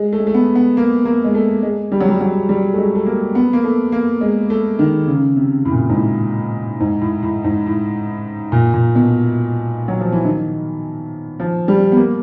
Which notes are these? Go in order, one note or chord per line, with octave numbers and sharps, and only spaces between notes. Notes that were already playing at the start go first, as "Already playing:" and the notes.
Already playing: G#3
A3
G#3
A3
B3
B3
A#3
A#3
G#3
A3
G#3
G3
F#3
G3
F#3
G3
A3
G#3
A3
A#3
B3
A#3
A3
A#3
G#3
A3
D#3
C#3
C3
A2
A#2
A2
G#2
A2
G#2
A2
A2
G#2
A2
A#2
A#2
B2
F#3
F3
E3
D#3
F3
G3
B3
A#3